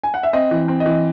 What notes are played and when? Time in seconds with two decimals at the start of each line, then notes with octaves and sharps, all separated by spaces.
0.03 G#5
0.14 F#5
0.23 E5
0.33 C4 D#5
0.51 E3
0.68 C4
0.80 D#5
0.86 E3